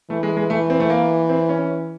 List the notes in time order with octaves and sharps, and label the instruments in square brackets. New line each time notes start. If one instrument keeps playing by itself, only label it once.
[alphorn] E3 [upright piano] A3
[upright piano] G#3
G#3
[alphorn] E3 [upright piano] A3
[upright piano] C4
A3
A#3
C4
C#4